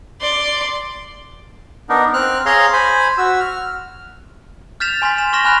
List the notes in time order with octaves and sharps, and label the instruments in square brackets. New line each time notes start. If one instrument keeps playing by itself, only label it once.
[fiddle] D5 C6
[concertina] B3 D4 D#4 A#4
C4 F6 F#6
G#4 C#5 F5 A#5 C6 F6
C5 G#5 B5
F#4 E6
F6
[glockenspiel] F6 G6 A6 B6 E7 F7
G#5 C6 F6 B6
E7
C6 C#6 F6 A#6 B6 E7
G#5 B5 C6 F6 F#6 F7